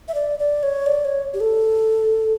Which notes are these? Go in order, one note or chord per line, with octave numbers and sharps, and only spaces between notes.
E5
D5
D5
C#5
D5
C#5
G4
A4